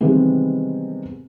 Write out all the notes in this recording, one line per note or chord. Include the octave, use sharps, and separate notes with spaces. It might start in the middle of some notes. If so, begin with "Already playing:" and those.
C3 D#3 E3 G3 G#3 B3